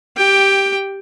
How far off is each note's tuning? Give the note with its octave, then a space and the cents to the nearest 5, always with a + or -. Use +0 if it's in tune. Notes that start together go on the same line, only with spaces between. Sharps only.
G4 +0 G5 +10